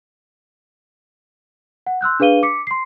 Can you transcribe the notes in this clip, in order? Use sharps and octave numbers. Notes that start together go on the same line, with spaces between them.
F#5
C6 E6 F#6 G6
D4 G#4 B4 F5 D#7 G7
D6 B6 C#7
C6 C7